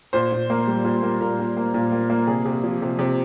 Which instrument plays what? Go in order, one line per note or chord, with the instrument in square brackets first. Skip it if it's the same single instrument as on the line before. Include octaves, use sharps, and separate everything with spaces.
[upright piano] A#2 C5
A#2
A#3
G3
A#2
A#3
A#2 A#4
A#2
A#3
A#2
A#3
A#3
C3 G#4
C3
F3
C3
C3